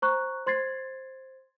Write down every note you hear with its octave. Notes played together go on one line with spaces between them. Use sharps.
C5 A#5 C#6 F#6
C5 C6 G#6 A6 C7